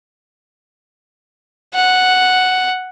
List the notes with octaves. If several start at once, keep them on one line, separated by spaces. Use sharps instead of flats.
F#5